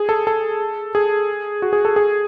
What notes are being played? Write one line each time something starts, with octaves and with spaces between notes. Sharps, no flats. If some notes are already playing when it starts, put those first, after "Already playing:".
Already playing: G#4
A4
A4
G#4
F#4
G#4
A4
G#4